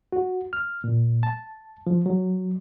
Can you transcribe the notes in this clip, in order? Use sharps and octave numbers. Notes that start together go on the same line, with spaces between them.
F#4
F6
A#2
A5
F3
F#3